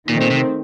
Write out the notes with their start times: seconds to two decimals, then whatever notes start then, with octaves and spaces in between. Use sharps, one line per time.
0.09 A#2 D#3
0.13 A3 C4
0.21 A#2
0.30 C3